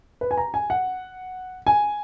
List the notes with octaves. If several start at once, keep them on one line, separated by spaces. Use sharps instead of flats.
B4
G#5
A#5
G#5
F#5
G#5